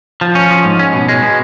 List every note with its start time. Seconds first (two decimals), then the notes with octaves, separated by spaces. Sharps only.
0.21 F3
0.35 C#4
0.50 F3
0.65 G#2
0.79 C#4
0.93 B2
1.09 G#3
1.23 B2